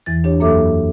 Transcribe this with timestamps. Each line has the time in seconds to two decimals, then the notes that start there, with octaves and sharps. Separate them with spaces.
0.06 E2 E3 A6
0.24 D4 G4 C#5
0.40 F#2 F#3 A#3 A4 E5 D6